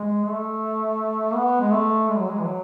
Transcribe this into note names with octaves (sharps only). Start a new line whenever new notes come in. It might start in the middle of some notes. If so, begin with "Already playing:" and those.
Already playing: G#3
A3
B3
G#3
A3
G#3
F#3
G#3
E3
F#3